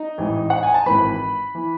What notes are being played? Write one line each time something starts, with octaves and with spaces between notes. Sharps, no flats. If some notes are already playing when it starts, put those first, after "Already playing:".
Already playing: D#4 D#5
A1 G#2 E3
F#5
G#5
A5
G#1 G#2 E3 B4 B5
E3